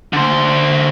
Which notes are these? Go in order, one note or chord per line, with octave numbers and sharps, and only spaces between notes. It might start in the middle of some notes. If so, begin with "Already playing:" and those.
D3 C5